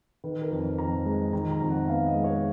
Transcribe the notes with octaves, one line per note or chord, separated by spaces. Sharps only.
D#3 B4
A#4
F2
F2 A#5
G#3
D#3 A#5
A#5
F2
F#5
B3 F5
D#5
G#3
C#5